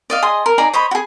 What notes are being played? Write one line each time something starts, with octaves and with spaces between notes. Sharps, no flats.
D5 D#5 F5
G#4 D#5 C6
A#4
D#4 G#4 D5 A#5
C5 C#5 D#5 B5
F#4 G#4